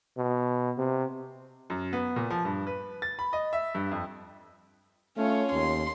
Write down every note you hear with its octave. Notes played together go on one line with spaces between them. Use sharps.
B2
C3
F#2
B3
A#2
F3
G2
B4
A6
B5
D#5
E5
G2
F2
A3 C#4 F4 C#5
D#2 C6